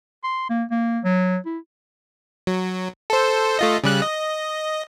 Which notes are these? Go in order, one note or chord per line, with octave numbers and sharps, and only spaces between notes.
C6
A#3
A#3
F#3
E4
F#3
A4 C5
A3 F4 D#5
C#3 G3 F#6
D#5